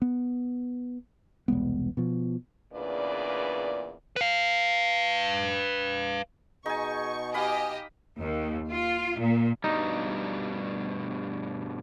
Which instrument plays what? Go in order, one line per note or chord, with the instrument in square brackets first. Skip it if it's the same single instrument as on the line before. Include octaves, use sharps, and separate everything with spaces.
[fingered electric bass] B3
E1 C2 G#3 B3
B2 F3
[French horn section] E2 A#2 C#3 D4 B4 D5
[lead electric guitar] B4 F5
[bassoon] B2 [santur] D#4 G#5 [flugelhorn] G#4 [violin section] C#6
[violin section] G4 D#5 [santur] F5 B5 [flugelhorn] G#5
[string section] D#2
F4
A#2
[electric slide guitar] G2 B2 G3 [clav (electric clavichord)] D#4